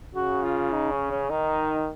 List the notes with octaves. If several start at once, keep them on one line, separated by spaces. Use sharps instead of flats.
C#3 F#4
F4
D#4
C#4
C#4
D#3 D#4